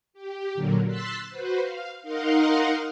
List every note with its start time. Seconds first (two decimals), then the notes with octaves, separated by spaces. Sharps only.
0.13 G4
0.55 A#2 D3 F#3 A#3
0.86 C6 E6 F#6 A6 B6
1.27 F#4 B4 C5
1.61 F5
2.02 D#4 A#4 D#5 F5 F#5 C6